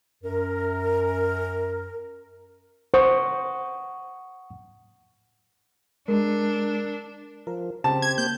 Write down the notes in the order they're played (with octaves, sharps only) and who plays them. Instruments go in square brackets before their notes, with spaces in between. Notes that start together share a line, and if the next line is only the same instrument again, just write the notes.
[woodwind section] F#2 A#4
[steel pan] C5 [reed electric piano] F#5 C#6 D#6
[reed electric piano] G#3 [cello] D4 [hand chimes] A#4
[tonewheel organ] F3 [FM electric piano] A#4
[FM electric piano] C#3 [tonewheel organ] C4 G4 [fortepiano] A5
[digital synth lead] G#6
[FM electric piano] A#3 [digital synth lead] G6